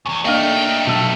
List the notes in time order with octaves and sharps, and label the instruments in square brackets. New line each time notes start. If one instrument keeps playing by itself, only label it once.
[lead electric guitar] E2 G#2 [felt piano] C#6
[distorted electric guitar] A3 D#4 [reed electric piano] A#3 D4 [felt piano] D#5 F5 F6 [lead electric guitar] G5
[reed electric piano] B2 F#3 [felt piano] A5 E6